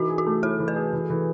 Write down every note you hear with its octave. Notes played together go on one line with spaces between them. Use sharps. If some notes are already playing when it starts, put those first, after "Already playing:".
Already playing: E3 D#4 F#4
G#4
F#4
A3
E4 A4
E3
B4
G#4
E3
E3